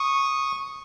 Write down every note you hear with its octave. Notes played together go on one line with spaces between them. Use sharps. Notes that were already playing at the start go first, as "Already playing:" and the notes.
Already playing: C#6 D#6